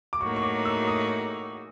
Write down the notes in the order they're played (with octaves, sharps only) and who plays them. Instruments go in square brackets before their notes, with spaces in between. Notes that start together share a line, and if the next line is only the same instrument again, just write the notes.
[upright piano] D6
[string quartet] A2 F#3 A#3 D#4 F#4 [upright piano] C#6
[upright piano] C#6
D6
E6
D#6